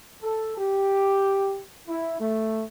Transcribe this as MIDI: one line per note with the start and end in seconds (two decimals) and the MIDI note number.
0.22 0.56 69
0.57 1.60 67
1.88 2.18 64
2.19 2.62 57